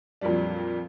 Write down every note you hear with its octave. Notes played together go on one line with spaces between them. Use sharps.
F2 A#2 F#3 G3 D4